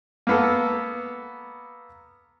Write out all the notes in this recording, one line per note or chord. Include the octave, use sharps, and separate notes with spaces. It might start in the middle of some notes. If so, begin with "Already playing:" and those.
A#3 B3 A4